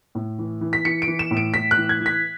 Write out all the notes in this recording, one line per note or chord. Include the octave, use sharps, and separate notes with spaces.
A2
E3
E3
B6
E3 C#7
D7
E3
E7
A2
D7
A2 B6
F#6
E3
G#6
E3
B6